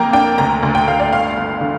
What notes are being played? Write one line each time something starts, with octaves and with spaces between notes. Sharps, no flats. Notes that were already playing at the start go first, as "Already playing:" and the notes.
Already playing: F2 A#3 G5 A#5
D4 G5
D2 A#5
D2
G5
D2 F5
D5
G1 F5
G1
D3